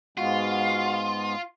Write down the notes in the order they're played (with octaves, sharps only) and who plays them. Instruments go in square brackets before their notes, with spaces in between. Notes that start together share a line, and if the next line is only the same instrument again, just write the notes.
[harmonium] G#2 G#3 B3 [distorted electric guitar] F4 [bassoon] F#4 [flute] F5